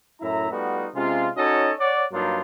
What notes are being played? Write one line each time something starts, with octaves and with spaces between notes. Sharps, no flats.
F#2 A2 E4 E5 A#5
G3 A3 B3 D#4 F4 F#4
C3 G#3 C#4 F4
C#4 D#4 F#4 A4 C#5 D#5
C#5 D5 F#5
G2 F#3 A#3 D4 D#4 F4